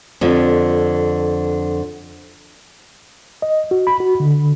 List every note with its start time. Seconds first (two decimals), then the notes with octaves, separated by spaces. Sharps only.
0.21 F2 D3
3.42 D#5
3.71 F#4
3.87 B5
4.00 F#4
4.20 D3